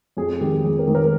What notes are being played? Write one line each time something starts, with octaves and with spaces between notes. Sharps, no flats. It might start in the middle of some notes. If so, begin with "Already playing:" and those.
F2 G#4
D#3 G#3 G4
F2 G#4
A#4
D#3 G#3
A#4